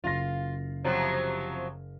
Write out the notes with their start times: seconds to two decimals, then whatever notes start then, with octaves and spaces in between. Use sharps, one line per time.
0.04 F#1 F4 F5 A#6
0.84 C3 F3 F#3